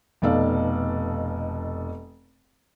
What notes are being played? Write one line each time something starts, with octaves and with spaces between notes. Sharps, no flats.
F1 B2 D#4 A4 D5 F5